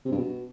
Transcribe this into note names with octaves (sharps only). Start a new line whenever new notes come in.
C3
G2
B2